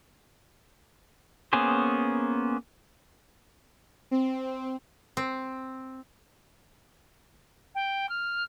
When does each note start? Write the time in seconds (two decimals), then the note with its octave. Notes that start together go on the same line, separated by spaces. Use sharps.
1.53 A#3 B3 C#4 G#4 C5
4.11 C4
5.17 C4
7.75 G5
8.09 F6